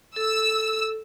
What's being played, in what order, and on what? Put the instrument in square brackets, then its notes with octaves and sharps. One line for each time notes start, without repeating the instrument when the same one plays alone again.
[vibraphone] A4 [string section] E6